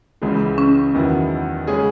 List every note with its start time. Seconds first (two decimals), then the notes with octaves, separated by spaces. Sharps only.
0.22 C#2 C#3 E3 G#3
0.58 C#4
0.94 E2 D#3 F#3 B3 E4
1.67 C#3 G#3 C#4 G#4